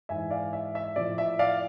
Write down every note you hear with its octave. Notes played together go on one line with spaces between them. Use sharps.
G#2 E3 E5 G#5
D5 F5
E5
E5
A2 F3 D5
E5
D5 F5